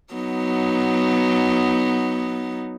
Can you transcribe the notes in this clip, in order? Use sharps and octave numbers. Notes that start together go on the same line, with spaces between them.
F#3 B3 D#4